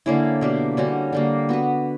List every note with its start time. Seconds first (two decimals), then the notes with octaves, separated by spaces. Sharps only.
0.06 D3 A#3 C#4 E4
0.41 B2 A#3 D4 G4
0.77 D3 G3 C#4 F#4
1.12 D3 G3 A#3
1.49 B3 F#4 B4